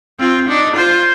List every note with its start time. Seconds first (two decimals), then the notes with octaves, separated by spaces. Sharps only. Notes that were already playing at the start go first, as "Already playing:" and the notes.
0.19 C4 F4
0.48 D4 D#4
0.76 F4 C5